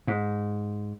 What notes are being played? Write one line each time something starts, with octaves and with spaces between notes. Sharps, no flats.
G#2